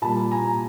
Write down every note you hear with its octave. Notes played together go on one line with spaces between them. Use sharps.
A#2 G3 A#3 A5 B5
G#5 A#5